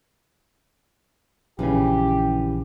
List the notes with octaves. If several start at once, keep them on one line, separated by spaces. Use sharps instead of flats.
A#1 C#3 E3 C#4 G4